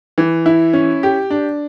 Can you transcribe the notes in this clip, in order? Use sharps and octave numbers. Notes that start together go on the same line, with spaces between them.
E3
E4
C#4
G4
D4